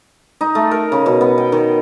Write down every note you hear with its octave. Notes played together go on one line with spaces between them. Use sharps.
D#4
A3
A#4
C#3
B2
B3
G5
D#3